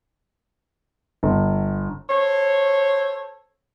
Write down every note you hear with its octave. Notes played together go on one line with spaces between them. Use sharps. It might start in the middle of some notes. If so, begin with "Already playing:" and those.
G1
A4 C5 C#5